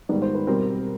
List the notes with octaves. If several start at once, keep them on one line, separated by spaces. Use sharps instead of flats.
G#2 D#3 G3 B3 D5
C5
B4
B2 G3 C4 A#4